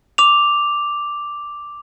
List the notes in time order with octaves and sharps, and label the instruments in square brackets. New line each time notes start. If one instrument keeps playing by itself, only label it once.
[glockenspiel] D6 F7